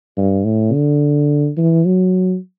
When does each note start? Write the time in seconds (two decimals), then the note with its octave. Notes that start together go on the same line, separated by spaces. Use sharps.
0.17 G2
0.44 A2
0.73 D3
1.57 E3
1.85 F#3